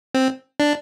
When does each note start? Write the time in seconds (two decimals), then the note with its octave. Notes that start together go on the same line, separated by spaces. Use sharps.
0.14 C4
0.60 D4